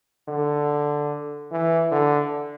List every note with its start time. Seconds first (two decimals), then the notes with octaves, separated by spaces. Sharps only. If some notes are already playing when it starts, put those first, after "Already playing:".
0.28 D3
1.52 E3
1.91 D3